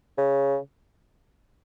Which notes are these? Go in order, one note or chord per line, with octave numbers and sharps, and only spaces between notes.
C#3